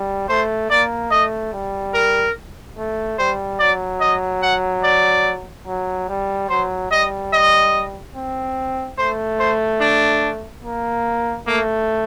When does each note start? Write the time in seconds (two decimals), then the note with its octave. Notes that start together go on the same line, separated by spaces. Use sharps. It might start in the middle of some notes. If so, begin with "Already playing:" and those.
Already playing: G3
0.29 A3 C5
0.70 A#3 D5
1.11 A3 D#5
1.53 G3
1.94 A#4
2.78 A3
3.19 G3 C5
3.59 F#3 D5
4.01 D#5
4.43 F#5
4.84 D5
5.67 F#3
6.09 G3
6.50 F#3 C5
6.91 G3 D#5
7.33 D#5
8.16 C4
8.98 A3 C5
9.40 C5
9.81 D4
10.63 A#3
11.47 A3 A#3